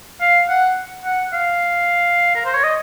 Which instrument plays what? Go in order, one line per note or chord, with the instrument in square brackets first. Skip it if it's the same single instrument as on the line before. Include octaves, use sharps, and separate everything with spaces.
[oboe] F5
F#5
F#5
F5
A#4
C5
C#5
D#5